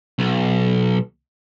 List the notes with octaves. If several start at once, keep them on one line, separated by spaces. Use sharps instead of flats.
B1